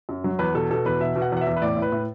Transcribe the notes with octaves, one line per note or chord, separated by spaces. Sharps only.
F#2
F#3
E2 B4
B2 A4
B2 A4
E2 B4
B2 E5
B2
F#5
E2 F#5
E5
E2
B4
A2 D5
A2
B4
A2